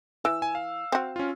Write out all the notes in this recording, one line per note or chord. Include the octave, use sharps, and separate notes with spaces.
E3 E6
G#5
F5
C4 F#4
C#4 F4